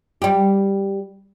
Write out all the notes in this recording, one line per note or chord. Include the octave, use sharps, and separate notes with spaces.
G3 G4